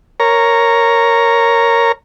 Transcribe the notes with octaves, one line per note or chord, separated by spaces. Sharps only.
A#4 C#5 A#5